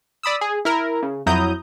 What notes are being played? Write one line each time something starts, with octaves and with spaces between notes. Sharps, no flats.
D5 B5 D#6 E6
G#4
E4 A#4
C#3
F2 F#3 E4 A#5 D#6 G6